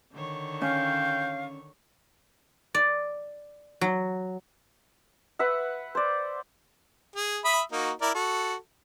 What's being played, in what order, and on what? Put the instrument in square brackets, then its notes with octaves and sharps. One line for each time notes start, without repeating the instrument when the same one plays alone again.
[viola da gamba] D3 D#3 C#5
[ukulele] C#4 [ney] F5 [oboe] G5
[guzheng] D5
F#3
[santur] B4 E5 F#5
C5 D5
[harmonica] G#4
E5 B5 D#6
A#3 D#4 F#4
E4 A#4 D5
F#4 A4